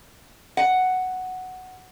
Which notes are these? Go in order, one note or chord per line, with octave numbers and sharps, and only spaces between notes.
F#5